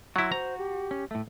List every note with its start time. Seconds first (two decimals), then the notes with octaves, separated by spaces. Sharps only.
0.16 F#3 E4 F#4 C6
0.32 C5 A#5
0.58 G4
0.91 C#4
1.11 A2 A3